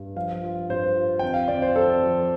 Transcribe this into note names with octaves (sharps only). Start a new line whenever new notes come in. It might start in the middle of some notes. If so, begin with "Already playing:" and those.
Already playing: G2
F3 F5
F4
G2 C5
F4
F2 G5
F5
F2 D5
C5
F2 A4
F3